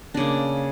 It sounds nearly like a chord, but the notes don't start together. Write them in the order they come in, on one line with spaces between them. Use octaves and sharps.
D4 C#3 A#3